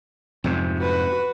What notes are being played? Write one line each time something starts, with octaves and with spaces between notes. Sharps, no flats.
F2 G#2 C3
F#4 B4